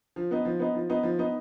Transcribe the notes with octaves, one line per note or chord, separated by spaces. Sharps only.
F3
B3 D#4
F3
B3 D#4
F3
B3 D#4
F3
B3 D#4